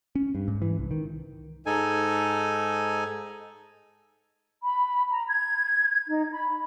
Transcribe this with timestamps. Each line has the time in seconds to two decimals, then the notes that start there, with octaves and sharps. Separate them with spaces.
0.15 C#4
0.35 G2
0.48 G#2
0.62 E3
0.79 C2
0.91 D#3
1.66 G#2 D#4 A4 G#5
4.62 B5
5.10 A#5
5.27 G#6
6.08 D#4
6.32 B5